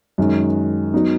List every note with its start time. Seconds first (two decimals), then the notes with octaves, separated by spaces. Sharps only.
0.18 F#2 D#3 G#3
0.94 F#3 B3 D#4